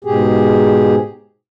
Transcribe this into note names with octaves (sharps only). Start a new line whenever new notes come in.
G#2 B2 G4 G#4